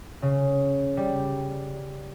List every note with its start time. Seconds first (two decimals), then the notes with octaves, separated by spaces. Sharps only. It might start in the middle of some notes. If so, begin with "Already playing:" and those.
0.22 C#3
0.97 G3